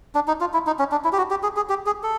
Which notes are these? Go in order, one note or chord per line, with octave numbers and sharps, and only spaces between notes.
D4
D#4
F4
E4
D#4
C#4
D4
E4
G4
F#4
G4
G#4
G#4
G4
G#4
A4